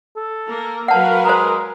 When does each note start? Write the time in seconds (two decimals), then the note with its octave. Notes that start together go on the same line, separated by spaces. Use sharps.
0.16 A4
0.47 A#3 A#4
0.88 F#3 A#4 B4 F5 F#5 A5
1.25 G#3 C5 A#5